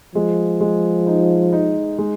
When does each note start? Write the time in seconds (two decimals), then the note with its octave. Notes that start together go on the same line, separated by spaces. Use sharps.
0.15 F3 G#3
0.61 G#3
1.07 D#4
1.52 D#4
1.98 G#3